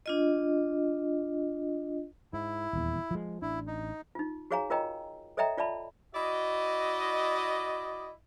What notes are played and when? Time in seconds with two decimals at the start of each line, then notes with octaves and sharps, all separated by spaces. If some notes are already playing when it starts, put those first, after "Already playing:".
0.06 D4 F4 D#5
2.33 G#2 E4
2.73 D#1 E2
3.11 F3 G#3
3.42 A1 D4 E4
3.67 D#4
4.15 D#4 F4
4.51 F#4 G#4 C#5 F5 G#5 A#5
4.70 F4 A#4 C#5 D#5 G5 A#5
5.37 A4 C#5 D#5 E5 G5 A#5
5.58 F4 D5 E5 A5 B5
6.15 E4 F#4 D5 D#5